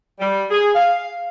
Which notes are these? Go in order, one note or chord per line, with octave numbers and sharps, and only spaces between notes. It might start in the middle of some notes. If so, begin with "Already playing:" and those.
G3
G#4
F5